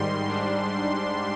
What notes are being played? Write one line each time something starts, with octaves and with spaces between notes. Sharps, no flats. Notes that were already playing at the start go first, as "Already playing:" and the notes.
Already playing: G#2 D#3 G3 C6
G#2 G3 D4